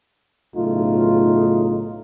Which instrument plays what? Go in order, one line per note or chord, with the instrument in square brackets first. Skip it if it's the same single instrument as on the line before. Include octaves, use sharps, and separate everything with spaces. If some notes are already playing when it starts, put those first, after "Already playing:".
[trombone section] B1 A2 C#3 A3 D#4 F4